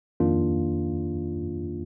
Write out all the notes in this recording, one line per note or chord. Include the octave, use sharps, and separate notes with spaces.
F2 D#3 A#3 D4 F4